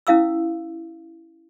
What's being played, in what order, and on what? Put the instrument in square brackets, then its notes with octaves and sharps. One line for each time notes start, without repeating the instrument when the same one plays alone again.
[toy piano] C#4 E4 F5 D#6 E6